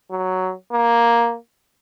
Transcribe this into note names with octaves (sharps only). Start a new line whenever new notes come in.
F#3
A#3